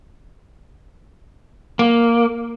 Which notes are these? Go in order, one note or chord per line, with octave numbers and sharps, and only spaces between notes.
A#3